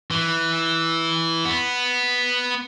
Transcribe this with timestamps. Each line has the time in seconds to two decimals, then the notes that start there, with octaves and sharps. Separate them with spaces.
0.11 E3
1.45 B3